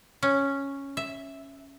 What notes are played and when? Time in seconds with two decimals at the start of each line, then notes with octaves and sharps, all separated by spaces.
0.23 C#4
0.97 E5